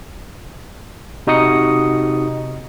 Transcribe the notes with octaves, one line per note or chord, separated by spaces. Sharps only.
C3 D#4 F#4 D#5 D#6 C#7